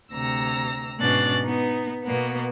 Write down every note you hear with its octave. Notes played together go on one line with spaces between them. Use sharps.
D2 C3 A#5 E6 A#6
G#2 B2 C#4 D4 F#6 A6
B3 D#4
B2 A#3 B3